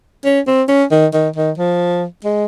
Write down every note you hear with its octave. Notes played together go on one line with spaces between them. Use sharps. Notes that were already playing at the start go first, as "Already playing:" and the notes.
C#4
C4
C#4
D#3
D#3
D#3
F3
G#3